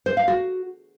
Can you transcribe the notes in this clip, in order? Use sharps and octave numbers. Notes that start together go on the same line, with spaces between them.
C5
F5
F#4